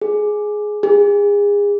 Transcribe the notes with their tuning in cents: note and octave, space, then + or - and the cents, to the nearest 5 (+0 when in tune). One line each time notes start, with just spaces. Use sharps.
G#4 +10
G#4 -30